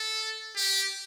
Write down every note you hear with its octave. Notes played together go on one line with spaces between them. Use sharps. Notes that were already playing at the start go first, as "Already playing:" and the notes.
Already playing: A4
G4